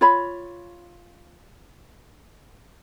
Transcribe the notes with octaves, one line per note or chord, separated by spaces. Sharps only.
F4 C#5 B5